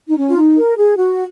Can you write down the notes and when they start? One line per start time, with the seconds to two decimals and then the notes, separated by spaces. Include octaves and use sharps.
0.09 D#4
0.17 C#4
0.28 F4
0.36 D#4
0.57 A#4
0.76 G#4
0.97 F#4